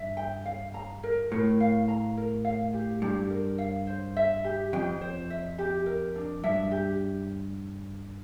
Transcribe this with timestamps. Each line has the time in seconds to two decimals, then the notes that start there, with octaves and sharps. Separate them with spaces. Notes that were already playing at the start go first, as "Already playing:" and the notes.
Already playing: G2 E5
0.17 G5
0.45 F5
0.74 A#5
1.03 A#4
1.31 A2 A#4
1.60 F5
1.88 A#5
2.17 A#4
2.45 F5
2.73 G4
3.02 G2 G4
3.30 A#4
3.58 F5
3.87 C5
4.16 E5
4.44 G4
4.73 F2 G5
5.01 C5
5.30 E5
5.58 G4
5.86 A#4
6.16 D4
6.44 G2 E5
6.71 G4